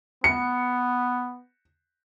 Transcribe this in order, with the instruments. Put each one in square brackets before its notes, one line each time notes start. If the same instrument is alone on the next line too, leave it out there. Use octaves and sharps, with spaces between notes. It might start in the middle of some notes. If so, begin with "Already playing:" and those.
[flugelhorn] B3 [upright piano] C#7